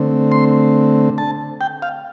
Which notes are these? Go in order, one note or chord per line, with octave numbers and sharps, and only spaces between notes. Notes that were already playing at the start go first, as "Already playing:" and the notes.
Already playing: D3 A3 C4
C6
A5
G5
F5